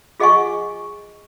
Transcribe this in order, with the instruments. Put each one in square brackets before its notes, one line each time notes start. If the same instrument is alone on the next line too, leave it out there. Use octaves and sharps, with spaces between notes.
[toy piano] F4 G#4 D#5 F#5 G#5 C#6